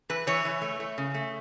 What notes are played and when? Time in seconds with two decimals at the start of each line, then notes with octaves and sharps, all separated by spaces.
0.09 E3 B4
0.27 E3 C#5
0.45 E3
0.62 A3
0.80 A3
0.98 C#3
1.14 A3